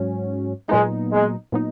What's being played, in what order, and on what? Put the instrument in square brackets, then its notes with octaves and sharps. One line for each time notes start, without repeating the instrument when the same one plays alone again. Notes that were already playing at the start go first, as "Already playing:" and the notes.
Already playing: [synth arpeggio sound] G#2 F#3 C#4 F#4
[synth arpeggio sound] A#2 F#3 B3 D#4 [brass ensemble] G#3
[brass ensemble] G#3
[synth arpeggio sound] A#2 F#3 B3 D#4